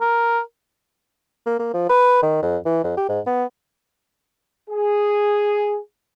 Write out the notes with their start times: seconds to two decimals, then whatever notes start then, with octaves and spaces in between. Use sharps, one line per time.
0.01 A#4
1.46 A#3
1.59 A#3
1.74 F3
1.89 B4
2.22 D#3
2.43 F2
2.66 E3
2.84 F2
2.97 G4
3.09 G#2
3.26 B3
4.70 G#4